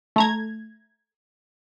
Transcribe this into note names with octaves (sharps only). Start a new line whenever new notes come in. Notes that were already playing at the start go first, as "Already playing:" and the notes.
A3 A#5 G#6